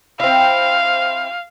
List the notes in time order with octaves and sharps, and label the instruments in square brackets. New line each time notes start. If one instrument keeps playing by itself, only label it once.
[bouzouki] C4 E4 [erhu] F5